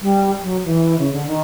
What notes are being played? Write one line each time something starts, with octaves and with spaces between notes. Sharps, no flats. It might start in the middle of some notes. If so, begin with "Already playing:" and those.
G3
F#3
E3
C#3
D3
D#3